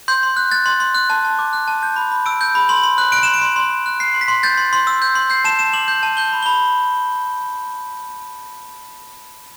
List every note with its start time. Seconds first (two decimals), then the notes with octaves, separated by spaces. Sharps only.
0.08 C6 G6
0.23 C6
0.37 F#6
0.51 F#6 A6
0.66 C6
0.80 C6
0.95 F#6
1.10 A5
1.25 A5
1.39 D6
1.53 F#6
1.68 A5
1.83 G6
1.96 B5
2.12 B5
2.26 E6 D7
2.41 G6
2.55 B5
2.69 C6 F#7
2.83 C6
2.98 F#6
3.12 F#6 D7
3.23 C6 E7
3.34 D7
3.41 C6
3.56 C6
3.71 C6
3.86 F#6
4.00 F#6 C7
4.14 C6
4.21 B6
4.28 C6
4.43 G6 A6
4.57 C6
4.73 C6
4.87 E6
5.02 G6
5.15 C6
5.30 G6 C7
5.44 A5 E7
5.59 A5 E7
5.74 D6 F#7
5.88 G6
6.03 A5
6.17 G6 G7
6.32 B5
6.43 G7
6.46 B5